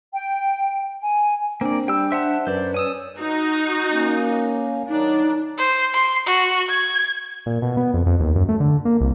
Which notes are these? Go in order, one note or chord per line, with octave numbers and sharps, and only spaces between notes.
G5
G#5
A#3 C4 D4 D5
G3 G5 E6
C5 E5 F#5 A5
F#2 B4 C5 D5
C#4 G#5 D#6 E6
D#4 F#4
A#3 C#4
D#3 F#3 D4 D#4
C5
C6
F#4
G#6
A#2
B2
B3
F2
F2
D#2
F#2
A3
D3
A#3
C2